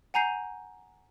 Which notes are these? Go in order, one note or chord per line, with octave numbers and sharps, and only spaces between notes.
F#5 G#5 A#5 G6 C7 D#7